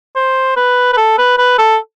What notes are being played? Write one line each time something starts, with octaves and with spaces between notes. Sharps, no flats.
C5
B4
B4
A4
B4
B4
A4